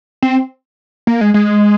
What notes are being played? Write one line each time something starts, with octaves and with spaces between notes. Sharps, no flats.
C4
A#3
G#3
G#3